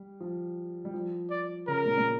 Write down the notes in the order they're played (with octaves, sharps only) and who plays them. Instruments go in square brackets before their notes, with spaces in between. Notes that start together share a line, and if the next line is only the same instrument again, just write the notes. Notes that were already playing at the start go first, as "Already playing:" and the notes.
Already playing: [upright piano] G3
F3
G3
F3
[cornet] D5
[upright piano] C#3 [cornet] A#4
[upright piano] A#2
A#2